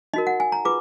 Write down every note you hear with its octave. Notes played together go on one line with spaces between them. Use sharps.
D#4 F#4 A#4 D#5
F#5
G#5
A#5
F4 G#4 B4 D6